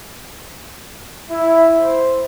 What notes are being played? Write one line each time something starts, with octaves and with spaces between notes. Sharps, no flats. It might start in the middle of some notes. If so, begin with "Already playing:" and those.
E4
C5